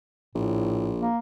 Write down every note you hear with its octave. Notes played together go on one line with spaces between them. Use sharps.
A#1 A2
A#3